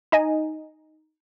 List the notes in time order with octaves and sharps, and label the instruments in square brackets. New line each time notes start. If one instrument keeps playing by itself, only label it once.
[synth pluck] D#4 D#5 G#5